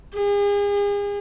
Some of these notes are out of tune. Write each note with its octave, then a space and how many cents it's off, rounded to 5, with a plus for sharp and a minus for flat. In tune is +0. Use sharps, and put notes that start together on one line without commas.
G#4 -40